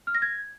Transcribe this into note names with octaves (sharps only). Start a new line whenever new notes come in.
F6
A#6
G#6